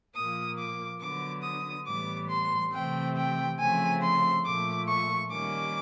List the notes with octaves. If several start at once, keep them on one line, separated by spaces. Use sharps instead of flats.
A#2 F3 A#3 D#6
D6
D3 F#3 B3 D6
D#6
A2 E3 G3 B3 D6
C6
C3 E3 A3 C4 G5
G5
C#3 F3 A3 C4 G#5
C6
A#2 F3 A3 D6
C#6
D#3 G3 A#3 C#4 D6